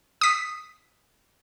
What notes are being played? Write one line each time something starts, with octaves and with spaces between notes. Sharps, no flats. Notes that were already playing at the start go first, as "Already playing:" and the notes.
D#6 B6